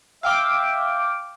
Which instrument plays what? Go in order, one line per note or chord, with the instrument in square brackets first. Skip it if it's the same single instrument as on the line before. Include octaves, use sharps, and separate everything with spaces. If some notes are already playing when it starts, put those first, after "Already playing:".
[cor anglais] E5 [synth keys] F5 G5 D6